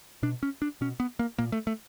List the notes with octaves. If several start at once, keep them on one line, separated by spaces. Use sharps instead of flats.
B2 D4
C#4
D4
B2 C#4
B3
A#3
A#2 A#3
A3
A3